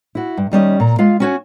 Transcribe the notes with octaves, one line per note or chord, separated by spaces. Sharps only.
E4 F#4
G2
D#2 G3 C#4 D#5
A#2 A#5
G#3 F4 F5
C#4 F#4 G#5